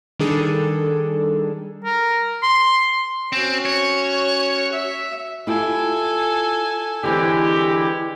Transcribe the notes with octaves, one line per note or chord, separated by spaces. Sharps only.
D#3 G3 D4 G#4 A4
A#4
C6
C4 C#4 F#4
C#5
E5
E4 F4 G4 A4 G#5
D3 E3 G#3 C4 E4 G4